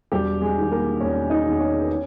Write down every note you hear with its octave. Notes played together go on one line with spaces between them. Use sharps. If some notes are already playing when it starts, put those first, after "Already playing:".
E1 G3 G4
G#3 G#4
E2 D#3
A#3 A#4
E1 C#4 C#5
D#4 D#5
E2 D#3
C#4 C#5
B4
C#4 C#5